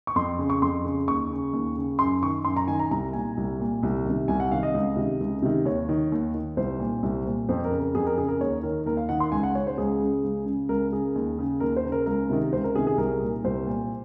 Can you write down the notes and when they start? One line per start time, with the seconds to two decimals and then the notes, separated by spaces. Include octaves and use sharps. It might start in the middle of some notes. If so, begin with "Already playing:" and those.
0.07 C#6
0.16 F2 C6
0.39 C#3
0.50 C#6
0.62 F2 C6
0.85 C#3
1.08 D#2 C#6
1.30 C#3
1.53 D#2
1.77 C#3
1.99 F#2 C6
2.22 D#3 C#6
2.45 F#2 C6
2.56 A#5
2.67 D#3 G#5
2.79 A#5
2.91 C2 A#5
3.13 A#2 G#5
3.37 C2
3.60 A#2
3.83 C2
4.05 C3 D#3
4.28 C2 G#5
4.40 F#5
4.51 C3 D#3 F5
4.63 D#5
4.74 C#2
4.97 C3 D#3
5.20 C#2
5.42 C3 D#3
5.65 D#2 C#5
5.89 D#3
6.12 D#2
6.34 D#3
6.57 C2 C5
6.80 A#2
7.03 C2
7.26 A#2
7.49 F2 C5
7.65 A#4
7.71 C#3
7.80 A#4
7.95 F2 G#4
8.07 A#4
8.17 C#3 G#4
8.28 A#4
8.41 D#2 C#5
8.63 D#3 A#4
8.86 D#2 A#4
8.97 F5
9.09 D#3 F#5
9.20 C6
9.32 C#2 G#5
9.43 F#5
9.55 C#3 C#5
9.67 C5
9.78 C#2 G#4
10.00 C#3
10.24 C#2
10.46 C#3
10.69 C#2 A#4
10.92 C#3 G#4
11.15 D#2
11.38 C#3
11.60 D#2 A#4
11.77 C5
11.84 C#3
11.92 A#4
12.06 C#2 A#4
12.30 C3 D#3
12.53 C#2 C5
12.64 A#4
12.75 C3 D#3 G#4
12.87 G#4
12.98 C2 A#4
13.22 A#2
13.44 C2 C5
13.67 A#2